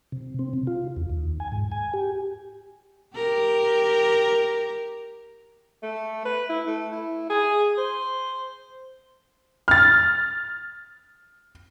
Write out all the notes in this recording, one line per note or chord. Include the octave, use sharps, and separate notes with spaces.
C3
C4
C3
F4
E2
D#2
G#5
G#2
G#5
G4
G4 A#4
A3
B4
E4
A3
E4
G#4
C5
F6 A6